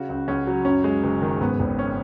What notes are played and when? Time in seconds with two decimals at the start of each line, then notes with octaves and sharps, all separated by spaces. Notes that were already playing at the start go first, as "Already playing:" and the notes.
Already playing: C#3 F#4
0.09 C#2
0.28 C#2 C#4
0.47 F#3
0.65 F#2 C#4
0.84 G#3
1.04 F#1
1.22 D#3
1.41 G#2 B3
1.60 G#1
1.79 C#4